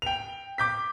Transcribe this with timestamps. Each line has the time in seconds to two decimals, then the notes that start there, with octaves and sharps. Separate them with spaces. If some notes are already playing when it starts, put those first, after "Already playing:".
0.02 G5 F7
0.58 D6 G6 B6